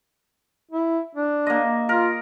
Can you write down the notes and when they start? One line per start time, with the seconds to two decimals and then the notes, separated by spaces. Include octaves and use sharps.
0.71 E4
1.15 D4
1.47 A#3 D#5
1.89 F4 A#4